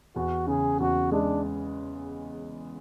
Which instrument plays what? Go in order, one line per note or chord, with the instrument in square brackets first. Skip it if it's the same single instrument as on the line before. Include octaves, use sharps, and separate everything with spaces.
[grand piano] E2 [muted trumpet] F#4
[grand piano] C#3 [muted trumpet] G#4
[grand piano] E2 [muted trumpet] F#4
[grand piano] G#3 [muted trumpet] D4